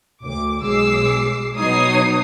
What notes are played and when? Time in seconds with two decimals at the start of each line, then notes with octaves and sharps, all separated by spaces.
0.21 D2 D6
0.61 B1 G#3 D6 E6 C7
1.57 B2 F#3 D#4 C#5 D#6 C7